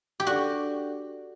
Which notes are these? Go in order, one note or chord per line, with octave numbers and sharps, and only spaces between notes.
G4
D4 F#4 A4 D5 F#5